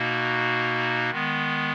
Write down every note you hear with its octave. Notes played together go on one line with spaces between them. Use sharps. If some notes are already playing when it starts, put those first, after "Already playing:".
Already playing: B2 A#3 D#4 F#4
D#3 G#3 B3